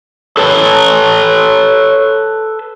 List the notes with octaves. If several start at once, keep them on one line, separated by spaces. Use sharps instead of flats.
A4 B4 C#5 A5